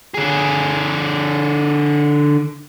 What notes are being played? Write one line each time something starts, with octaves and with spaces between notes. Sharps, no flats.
D3 G#4